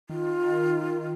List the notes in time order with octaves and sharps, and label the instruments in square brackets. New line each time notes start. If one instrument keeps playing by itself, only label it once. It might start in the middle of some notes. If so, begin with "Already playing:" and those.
[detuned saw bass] D#3 [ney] F4